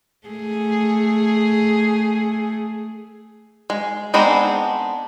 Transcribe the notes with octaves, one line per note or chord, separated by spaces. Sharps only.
A3 G#4
G#3
G#3 B3 C4 D4 D#4